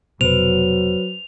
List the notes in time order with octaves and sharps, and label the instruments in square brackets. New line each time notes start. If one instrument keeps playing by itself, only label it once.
[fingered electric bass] F1 B2 [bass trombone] F#3 [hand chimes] B4 C5 [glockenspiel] F7